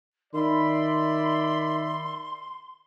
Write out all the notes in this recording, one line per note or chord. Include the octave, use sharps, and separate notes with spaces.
D#3 D5 E5 B5 C6